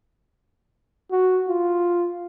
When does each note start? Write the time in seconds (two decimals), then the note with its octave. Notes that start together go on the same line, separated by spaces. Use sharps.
1.12 F#4
1.48 F4